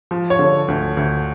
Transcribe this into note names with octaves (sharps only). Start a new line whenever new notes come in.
F3
C#5
D3
D2
D2